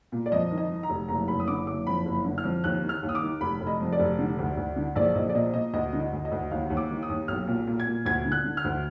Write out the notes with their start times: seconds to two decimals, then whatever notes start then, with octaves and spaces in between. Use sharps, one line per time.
0.12 A#2
0.26 D5
0.32 F2 D#5
0.51 D#3
0.58 D#5
0.70 D#3
0.83 A#5
0.90 F1
1.08 F#1 A#5
1.28 F#1 B5
1.40 D#6
1.48 D3 D6
1.67 F#1 D6
1.87 F2 B5
2.06 F#1
2.25 D3
2.38 F6
2.44 F2
2.64 D#2 F#6
2.83 D#3
2.89 F6
3.03 D#2
3.09 D#6
3.15 D6
3.22 D#3
3.41 F1 B5
3.61 F1
3.67 D#5
3.81 F2
3.93 D5
3.99 F1
4.19 D3
4.38 D2
4.57 D2
4.76 D3
4.96 A#1 D5
5.15 A#1 D#5
5.29 D5
5.35 A#2 D#5
5.54 A#2 D#5
5.73 D2 D#5
5.93 D3
6.00 D#5
6.13 D2
6.25 D#5
6.31 D2
6.51 D#2 F5
6.70 D#2
6.77 D6
6.90 D#3
7.03 D#6
7.09 D#2
7.28 B1 F6
7.48 A#2
7.67 A#2
7.80 G#6
7.87 A#2
8.05 D2 G#6
8.25 D3
8.32 F#6
8.44 D3
8.57 F6
8.64 D2